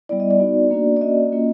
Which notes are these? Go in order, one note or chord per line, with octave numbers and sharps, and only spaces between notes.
G3 B3 E4 D5
D#5
D5
B3 D#4 F#4
A#3 D4 F#4
D5
A#3 C#4 F#4 D#5
A#3 C#4 F4